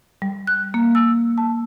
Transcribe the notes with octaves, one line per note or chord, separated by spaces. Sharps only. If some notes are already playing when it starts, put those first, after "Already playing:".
G3
F#6
A#3
E6
A5